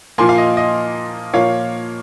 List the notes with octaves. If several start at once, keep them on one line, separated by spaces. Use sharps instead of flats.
A#2 F3 A#3 G#5 C6
F5
D#5
D#5
A#2 F3 A#3 C#5 F5